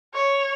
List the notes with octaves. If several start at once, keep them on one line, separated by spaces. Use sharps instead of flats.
C#5